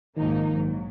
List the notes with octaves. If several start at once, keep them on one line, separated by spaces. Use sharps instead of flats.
A#1 G#2 D#3 F3 A#3 D#4
A#1 G#2 F#3